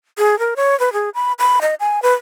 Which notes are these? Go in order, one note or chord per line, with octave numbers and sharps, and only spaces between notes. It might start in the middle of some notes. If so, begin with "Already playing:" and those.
G#4
A#4
C#5
B4
G#4
B5
B5
D#5
G#5
B4